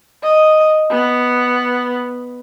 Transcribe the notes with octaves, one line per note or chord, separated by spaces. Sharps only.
D#5
B3